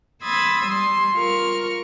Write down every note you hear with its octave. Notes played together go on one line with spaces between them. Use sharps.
B5 C6 D#6 E6 G#6 A6
G3 C6
F4 A#4 C#6 F6